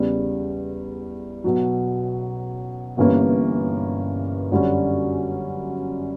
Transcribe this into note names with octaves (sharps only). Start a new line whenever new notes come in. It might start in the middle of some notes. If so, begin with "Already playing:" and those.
Already playing: E2 C#3 G3
B1 B2 F#3
G1 G2 E3 A#3 C#4
F#2 D3 G3 C#4